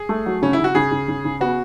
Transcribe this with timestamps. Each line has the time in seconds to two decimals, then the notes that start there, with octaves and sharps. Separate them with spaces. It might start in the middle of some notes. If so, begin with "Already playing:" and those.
Already playing: G#4
0.09 A3
0.26 F#3
0.42 C#3 C#4
0.53 E4
0.59 C#3 F#4
0.75 C#3 G#4
0.91 C#3
1.08 C#3
1.24 C#3
1.41 B3 F#4